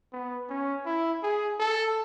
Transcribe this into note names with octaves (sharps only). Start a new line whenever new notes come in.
B3
C#4
E4
G#4
A4